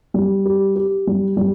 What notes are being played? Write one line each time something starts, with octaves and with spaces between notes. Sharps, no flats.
G3
G4
G4
G3
G3